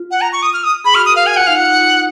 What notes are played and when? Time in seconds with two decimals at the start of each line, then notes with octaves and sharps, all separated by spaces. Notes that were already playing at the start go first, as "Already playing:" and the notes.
Already playing: F4
0.11 F#5
0.21 A#5
0.33 C#6
0.43 D#6
0.53 F6
0.64 D#6
0.84 G#4 B5
0.95 F#4 F6
1.05 D#6
1.09 A#4
1.16 F5
1.23 A#4
1.26 G#5
1.37 F4 F#5
1.47 D#4 F5
1.55 F4 F#5
1.68 D#4
1.80 F4